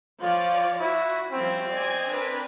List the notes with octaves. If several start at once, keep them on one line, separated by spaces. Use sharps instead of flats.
F3 F4 C#5 D5
E4 F#4
F3 G3 C4 C#4
D5 D#5 G#5
D4 A#4 B4